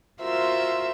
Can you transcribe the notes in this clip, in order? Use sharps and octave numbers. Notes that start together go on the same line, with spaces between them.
F4 F#4 A#4 C5 E5 E6